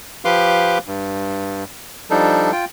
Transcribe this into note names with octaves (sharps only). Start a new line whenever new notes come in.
F3 G4 B4 F5 C6 D6
G2
F3 G3 D4 D#4 A4
F4 G5